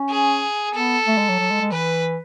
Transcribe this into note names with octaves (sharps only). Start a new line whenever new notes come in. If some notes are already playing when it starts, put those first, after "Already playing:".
Already playing: C#4
G#4
B3 A4
A3
G#3
F#3
F#3
G#3
G#3
E3 B4